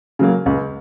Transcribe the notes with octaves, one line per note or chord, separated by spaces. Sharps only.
C#3 F#3 A#3
C#2